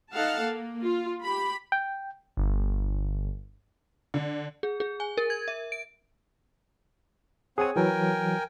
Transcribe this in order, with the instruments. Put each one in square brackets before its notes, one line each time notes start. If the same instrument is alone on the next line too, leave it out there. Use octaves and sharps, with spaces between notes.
[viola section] D#4 A4 F5 F#5 A5
A#3
F4
G4 B5
[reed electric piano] G5
[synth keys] G1
[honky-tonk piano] D3
[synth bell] G#4
G#4
G#5
A#4
G#6
E5
D7
[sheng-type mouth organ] C4 C#5 F#5 [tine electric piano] G#4 G#5
[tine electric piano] E3 F#3 [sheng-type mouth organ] A#4 G5 G#5